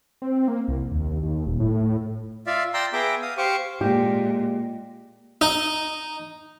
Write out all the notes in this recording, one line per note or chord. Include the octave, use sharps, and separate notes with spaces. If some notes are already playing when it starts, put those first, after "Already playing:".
C4
A#3
C2
D#2
D#2
D#1
A2
F4 D5 E5 F5
D5 G5 A#5 C6 E6
B3 G#4 E5 G5 A#5 D6
F5 D#6
G4 C5 F5 C#6 D6
A#2 G#3 G4
D#4